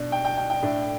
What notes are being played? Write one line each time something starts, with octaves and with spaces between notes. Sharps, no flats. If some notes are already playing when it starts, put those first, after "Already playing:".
Already playing: B2 D4
G5
G5
G5
G5
A2 A3 D4